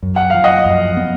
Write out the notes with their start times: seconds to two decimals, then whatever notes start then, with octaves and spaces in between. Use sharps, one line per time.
0.03 F#2
0.16 F#5
0.30 F3 F5
0.44 D#5 F#5
0.65 F#2
0.97 B3